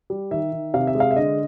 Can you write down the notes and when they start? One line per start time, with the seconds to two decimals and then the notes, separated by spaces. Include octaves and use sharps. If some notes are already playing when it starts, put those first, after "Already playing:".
0.10 G3
0.31 D#3 E5
0.52 D#3
0.74 C3 F5
0.87 E5
0.95 G#3
1.00 F5
1.11 E5
1.16 D3 D#5